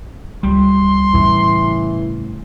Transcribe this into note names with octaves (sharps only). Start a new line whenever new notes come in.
C#2 G3 C6
A2 C#3 E3